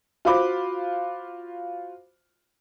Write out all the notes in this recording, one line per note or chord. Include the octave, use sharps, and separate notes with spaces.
F4 F#4 C5 B5 D6